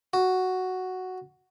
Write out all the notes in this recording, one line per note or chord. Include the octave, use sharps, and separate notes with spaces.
F#4